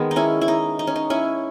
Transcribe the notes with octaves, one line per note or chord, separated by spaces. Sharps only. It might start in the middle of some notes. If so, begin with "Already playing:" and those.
Already playing: D#3 G#3 B3 G#4
D#4
C#4 E4
E4
D#4
D#4
C#4
D#4
C#4 E4